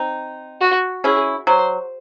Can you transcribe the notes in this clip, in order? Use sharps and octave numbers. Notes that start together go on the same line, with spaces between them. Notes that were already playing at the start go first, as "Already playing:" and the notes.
Already playing: C4 D#4
F#4
C#4 E4 G#4
F#3 C5